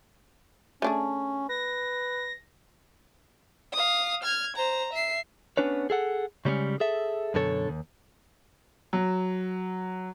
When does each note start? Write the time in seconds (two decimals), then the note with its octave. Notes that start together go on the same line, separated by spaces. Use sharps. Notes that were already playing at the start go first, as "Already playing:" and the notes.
0.82 A3 C#4 D4 G#4
1.49 B4 A#6
3.73 F5 D#6
4.23 F6 G#6
4.56 C5 A#5
4.93 E5 C7
5.57 B3 C#4 D4 B4 C#5
5.90 G#4 A4 F#5
6.45 C#3 G3 G#3 A#3 C#4
6.80 G#4 A4 E5
7.34 F#2 B2 D3 A4 C#5
7.69 D#2
8.93 F#3